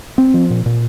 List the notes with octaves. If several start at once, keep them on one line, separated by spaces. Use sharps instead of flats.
C4
F3
A#2
A#2